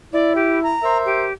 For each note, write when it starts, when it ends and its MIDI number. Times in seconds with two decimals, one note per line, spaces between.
0.13 0.74 64
0.13 0.33 74
0.35 0.61 67
0.63 0.98 82
0.83 1.26 70
0.83 1.26 72
0.83 1.26 76
1.05 1.33 67